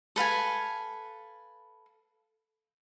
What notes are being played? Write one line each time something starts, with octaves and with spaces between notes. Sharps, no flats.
A4 B4 F5 G#5